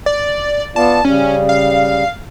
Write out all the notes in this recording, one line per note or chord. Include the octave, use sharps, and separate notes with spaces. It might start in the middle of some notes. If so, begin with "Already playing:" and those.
D5
B3 F4 D5 A5
C#3 G3 C#4
F5